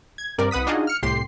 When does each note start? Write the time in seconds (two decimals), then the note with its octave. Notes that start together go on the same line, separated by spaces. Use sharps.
0.18 G#6
0.38 G2 C3 A#4 D5
0.51 C2 B4 F#5 D#6 B6
0.67 D4 D#4 F4 F#4 G#4 D#5
0.87 F6 C#7
1.03 C2 A2 G4 C6 C7